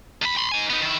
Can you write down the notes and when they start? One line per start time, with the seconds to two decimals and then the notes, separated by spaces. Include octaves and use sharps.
0.22 E2 B5
0.37 B5 C6
0.52 D#4 G#5
0.70 B3 D#4
0.82 D#3 E4